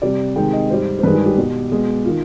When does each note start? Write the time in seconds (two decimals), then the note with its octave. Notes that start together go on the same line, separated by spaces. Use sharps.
0.02 C3 G3 D5
0.36 C3 D#3 G#3 G5
0.53 D#5
0.70 G#2 G3 C5
0.99 C5
1.03 G2 D#3 G#3 B4
1.15 G#4
1.26 G4
1.37 B2 G3
1.72 B2 G#3
2.05 D#3 F4